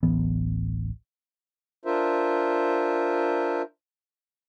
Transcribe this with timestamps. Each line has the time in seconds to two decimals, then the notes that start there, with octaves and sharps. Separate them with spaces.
0.03 D1 A1 E3 B3
1.85 D4 F4 A#4 C5 E5